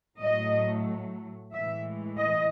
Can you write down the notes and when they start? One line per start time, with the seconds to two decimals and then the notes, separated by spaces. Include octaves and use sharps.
0.19 A2 F#3 A3 D#5
1.53 A2 E3 G#3 E5
2.18 D#5